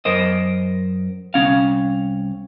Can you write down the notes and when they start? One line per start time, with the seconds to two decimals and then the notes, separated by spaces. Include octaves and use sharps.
0.05 F#2 A#4 C5 D#5
1.34 C2 C#4 F5